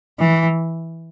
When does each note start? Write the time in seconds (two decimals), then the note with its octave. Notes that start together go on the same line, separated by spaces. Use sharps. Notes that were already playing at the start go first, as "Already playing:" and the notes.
0.19 E3